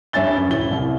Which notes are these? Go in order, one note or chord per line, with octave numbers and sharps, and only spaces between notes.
G2 C#5 E5 G#5 A6 G7
F#2
D1 E4 G7
C2